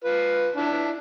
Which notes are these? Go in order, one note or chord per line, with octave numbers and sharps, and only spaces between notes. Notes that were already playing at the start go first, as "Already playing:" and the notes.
F4 B4
D4 E4